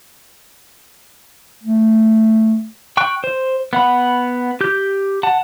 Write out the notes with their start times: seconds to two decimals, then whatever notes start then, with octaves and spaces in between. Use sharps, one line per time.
1.63 A3
2.97 G5 C#6 F#6
3.24 C5
3.73 B3 F#5 B5
4.61 G4 G6
5.23 F#5 A5